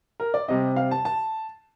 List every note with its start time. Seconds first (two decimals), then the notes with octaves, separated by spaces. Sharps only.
0.20 A#4
0.34 D5
0.48 C3 G3 C4 D#5
0.76 F5
0.91 A5
1.05 A5